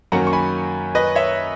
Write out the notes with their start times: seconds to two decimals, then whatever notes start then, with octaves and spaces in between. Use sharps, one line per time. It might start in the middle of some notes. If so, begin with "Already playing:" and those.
0.12 F#2 D#3 F#3 A#3 C#4 F#5 A#5
0.27 C#6
0.33 G#5 B5
0.95 B4 D#5
1.15 C#5 E5